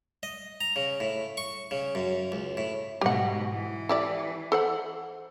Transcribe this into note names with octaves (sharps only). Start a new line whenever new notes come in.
D#5
A#5
C#3
A2
C#6
C#3
F#2
C#2
A2
G#2 B2 G4 F#5
E3
E4 G4 D5
A4 C5 F#5